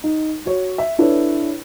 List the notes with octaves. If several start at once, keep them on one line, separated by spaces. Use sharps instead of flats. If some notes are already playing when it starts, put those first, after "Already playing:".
D#4
F#4 C#5
E5
D4 E4 A4 B4 C#5